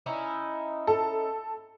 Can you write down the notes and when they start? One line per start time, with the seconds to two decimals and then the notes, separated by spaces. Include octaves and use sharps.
0.06 C#4 D#4 E4
0.87 A4